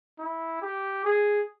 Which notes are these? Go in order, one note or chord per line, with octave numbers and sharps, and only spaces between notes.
E4
G4
G#4